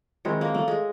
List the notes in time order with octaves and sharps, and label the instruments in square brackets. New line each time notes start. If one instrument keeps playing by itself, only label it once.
[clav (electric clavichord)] D#3 G#3 C4 E4 [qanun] F#3
[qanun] A#3
A3
G#3